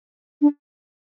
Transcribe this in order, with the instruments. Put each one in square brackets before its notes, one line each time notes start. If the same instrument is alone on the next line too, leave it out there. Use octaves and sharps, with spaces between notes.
[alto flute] D4